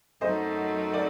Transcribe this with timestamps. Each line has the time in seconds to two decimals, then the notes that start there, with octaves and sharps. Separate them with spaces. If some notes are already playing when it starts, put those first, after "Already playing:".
0.21 F#2 F#3 A3 D#4 C5 D#5
0.93 A#4 D5